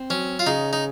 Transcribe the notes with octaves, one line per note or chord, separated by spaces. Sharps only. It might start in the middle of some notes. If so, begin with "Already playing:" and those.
Already playing: C4
F#3 C#4
F4
C#3 D#4
D#4